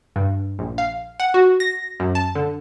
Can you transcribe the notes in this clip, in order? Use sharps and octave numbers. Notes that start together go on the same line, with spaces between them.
G2
A#1
F5
F#5
F#4
A#6
F#2
A5
D3